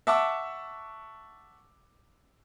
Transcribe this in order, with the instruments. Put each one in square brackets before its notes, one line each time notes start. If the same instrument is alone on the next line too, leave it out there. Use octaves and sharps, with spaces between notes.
[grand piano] E5 F#5 A5 C#6 D6 E6